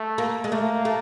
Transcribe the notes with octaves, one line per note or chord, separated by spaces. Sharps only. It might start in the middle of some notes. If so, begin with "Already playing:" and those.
Already playing: A3
A#3
G#3
A3 A#3
A3